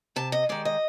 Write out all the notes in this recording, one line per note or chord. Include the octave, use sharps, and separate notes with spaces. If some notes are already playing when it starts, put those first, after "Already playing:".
C3 A5
D#5
D#3 G#3 D5
D#5